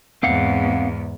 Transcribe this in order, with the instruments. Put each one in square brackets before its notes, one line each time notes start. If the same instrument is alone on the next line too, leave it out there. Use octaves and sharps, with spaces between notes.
[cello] E2 G#2 [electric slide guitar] C4 F5 F#5